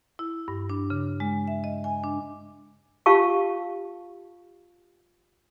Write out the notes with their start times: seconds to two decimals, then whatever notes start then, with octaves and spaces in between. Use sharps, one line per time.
0.19 E4
0.48 G2
0.70 D4
0.90 C#3
1.20 G#3
1.47 E5
1.64 D#5
1.84 G#5
2.04 D4
3.06 F4 G4 F5 A5 C#6